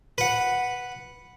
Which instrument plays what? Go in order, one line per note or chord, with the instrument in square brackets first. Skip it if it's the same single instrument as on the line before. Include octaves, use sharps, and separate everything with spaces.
[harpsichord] B4 F#5